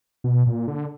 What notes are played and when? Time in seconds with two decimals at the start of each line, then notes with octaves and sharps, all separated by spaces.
0.24 B2
0.47 A#2
0.68 D3